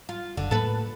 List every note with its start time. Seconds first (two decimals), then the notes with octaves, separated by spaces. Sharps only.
0.09 F4
0.37 F#1 D3
0.51 A2 A#3 A4 B4